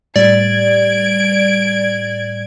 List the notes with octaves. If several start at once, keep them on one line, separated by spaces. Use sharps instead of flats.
A2 G3 D5 G#6 D7